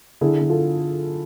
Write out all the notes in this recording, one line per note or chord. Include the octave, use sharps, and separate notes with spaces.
D3 E4 G#4
D3
F4 A4